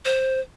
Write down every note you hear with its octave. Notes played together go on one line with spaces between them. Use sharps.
C5